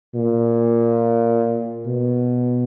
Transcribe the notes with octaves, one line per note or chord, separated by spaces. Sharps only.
A#2
B2